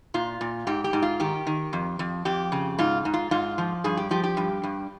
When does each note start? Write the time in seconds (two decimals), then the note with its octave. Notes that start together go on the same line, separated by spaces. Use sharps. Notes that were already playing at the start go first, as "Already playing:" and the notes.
0.14 A#2 F4
0.41 A#2
0.67 G#2 G4
0.84 G4
0.93 G#2
1.02 F4
1.20 D#3 G4
1.47 D#3
1.73 F2
1.99 F2
2.25 F2 G4
2.52 C#3
2.78 G#2 F4
3.05 G#2
3.14 F4
3.31 G#2 F4
3.58 F3
3.84 G2 G#4
3.97 G4
4.11 F3 G4
4.23 G4
4.37 G2
4.63 G2